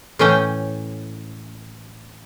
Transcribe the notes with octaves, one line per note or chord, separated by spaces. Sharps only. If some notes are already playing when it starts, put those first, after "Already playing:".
A2 E3 C#4 G5